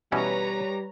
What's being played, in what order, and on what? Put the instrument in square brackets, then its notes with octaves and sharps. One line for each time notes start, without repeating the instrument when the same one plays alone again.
[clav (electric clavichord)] B2 E3 C#4 [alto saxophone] G3 [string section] B4 C#5 A#5